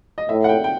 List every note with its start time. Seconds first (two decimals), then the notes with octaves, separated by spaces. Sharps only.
0.18 D#5
0.29 A2 E5
0.44 F#5
0.49 G5
0.64 G5